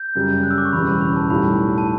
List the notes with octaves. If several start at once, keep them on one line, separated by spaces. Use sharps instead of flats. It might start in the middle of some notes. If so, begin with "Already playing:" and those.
Already playing: G6
F#2 C#3 G3
F#6
E6
D6
C#6
E1 E2 C#3 G3 B5
B5
B5
A5
B1 A2 G3 B5
A5